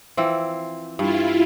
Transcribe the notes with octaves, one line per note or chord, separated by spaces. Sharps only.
E3 F3 C4
G2 E4 F4